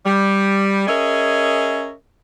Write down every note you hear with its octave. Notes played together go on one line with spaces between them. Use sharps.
G3
C#4 G#4 A#4 D#5 E5